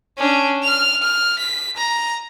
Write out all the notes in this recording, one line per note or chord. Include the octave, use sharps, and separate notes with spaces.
C#4 D4
F6 F7
F6
B6
A#5